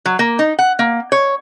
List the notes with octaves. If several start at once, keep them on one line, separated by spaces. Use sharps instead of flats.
F#3
A#3
D#4
F#5
A#3
C#5